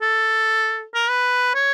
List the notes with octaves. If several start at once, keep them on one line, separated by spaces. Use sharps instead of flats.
A4
A#4
B4
C#5